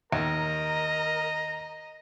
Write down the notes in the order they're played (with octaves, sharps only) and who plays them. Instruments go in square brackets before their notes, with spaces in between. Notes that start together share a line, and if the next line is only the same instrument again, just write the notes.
[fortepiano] D#2 [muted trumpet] A#4 [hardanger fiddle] D#5 [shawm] A#5